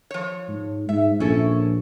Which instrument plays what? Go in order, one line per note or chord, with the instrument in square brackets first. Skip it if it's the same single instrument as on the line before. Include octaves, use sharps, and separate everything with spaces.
[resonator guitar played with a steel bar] F3 C#5
[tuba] G#2
[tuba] G#2 [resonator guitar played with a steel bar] E5
[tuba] A#1 [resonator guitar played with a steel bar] C#4 E4 A4